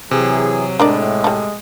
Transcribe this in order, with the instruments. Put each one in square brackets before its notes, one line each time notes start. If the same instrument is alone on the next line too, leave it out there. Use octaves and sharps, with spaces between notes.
[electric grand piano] C3 [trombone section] E3 G#4 [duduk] F#3
[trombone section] A2 [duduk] G#3 [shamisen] D4 A#4 D5
[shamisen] G3 A3